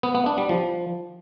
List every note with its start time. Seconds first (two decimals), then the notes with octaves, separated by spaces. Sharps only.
0.03 B3
0.15 B3
0.26 D4
0.38 G3
0.49 F3